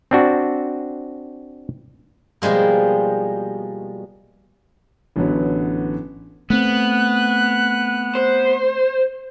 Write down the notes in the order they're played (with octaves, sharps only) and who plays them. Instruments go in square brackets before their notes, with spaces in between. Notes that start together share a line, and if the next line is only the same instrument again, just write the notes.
[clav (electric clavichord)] C4 D4 F#4
[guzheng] B2 F3 G3 G#3 A#3
[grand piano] A1 D3 F#3 B3
[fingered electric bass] A3 C4 [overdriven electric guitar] B3 [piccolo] F#6
[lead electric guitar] C5